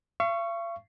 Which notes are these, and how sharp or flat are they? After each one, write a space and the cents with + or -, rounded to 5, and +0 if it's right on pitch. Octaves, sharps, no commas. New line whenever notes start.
F5 -45 C#6 +0